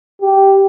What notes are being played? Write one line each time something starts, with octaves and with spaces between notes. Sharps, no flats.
G4